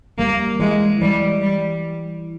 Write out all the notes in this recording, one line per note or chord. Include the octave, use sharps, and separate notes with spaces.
G3 A#3
E3 G#3
E3 G3
G3